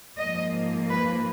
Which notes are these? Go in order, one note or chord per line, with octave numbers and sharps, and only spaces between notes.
G#2 F3 A#3 D#5
B4